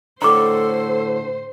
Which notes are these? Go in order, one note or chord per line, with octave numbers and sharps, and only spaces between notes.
A2 D3 A4 C5 A#5 D6